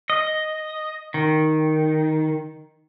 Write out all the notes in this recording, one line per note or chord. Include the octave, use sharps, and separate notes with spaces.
D#5
D#3